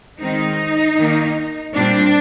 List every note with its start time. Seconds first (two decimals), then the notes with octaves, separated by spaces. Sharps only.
0.20 D#3 G#3 C4 D#4
0.97 D#3 A#3
1.74 A#2 G3 C4 D4